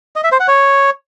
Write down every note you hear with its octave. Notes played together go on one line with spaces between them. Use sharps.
D#5
E5
C5
F#5
C#5